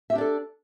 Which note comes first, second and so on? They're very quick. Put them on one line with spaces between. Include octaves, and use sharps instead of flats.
E5 G4 D4 D5 A4